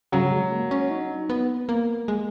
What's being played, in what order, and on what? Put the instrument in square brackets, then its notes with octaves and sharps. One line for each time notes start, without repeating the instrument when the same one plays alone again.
[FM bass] C#3 [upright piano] F#3
[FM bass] G#3
A#3
C#4
D#4
B3
A#3
G#3